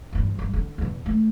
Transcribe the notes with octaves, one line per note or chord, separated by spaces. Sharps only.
E2 G2
G2
D3
E2 B2
A3